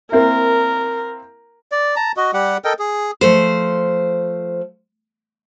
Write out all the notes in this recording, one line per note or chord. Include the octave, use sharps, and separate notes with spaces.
A#3 C4 E4 A#4
D5
A5 A#5
F#4 D#5
G3 G4 F#5
A4 A#4 D#5 G5
G#4
F3 A3 C5